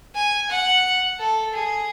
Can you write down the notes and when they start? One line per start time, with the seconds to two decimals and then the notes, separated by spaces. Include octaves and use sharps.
0.15 G#5
0.50 F#5
1.19 A4
1.53 G#4